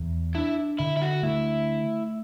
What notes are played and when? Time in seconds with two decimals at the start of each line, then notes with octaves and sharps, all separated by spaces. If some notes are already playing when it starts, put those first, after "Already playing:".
Already playing: E2
0.35 D4 E4
0.79 D3 E4
0.97 E4
1.02 F#4
1.23 A3 E4